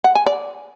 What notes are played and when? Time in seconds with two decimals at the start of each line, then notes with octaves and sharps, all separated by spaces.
0.04 F#5
0.15 G#5
0.26 D5